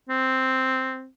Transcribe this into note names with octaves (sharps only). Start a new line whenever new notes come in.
C4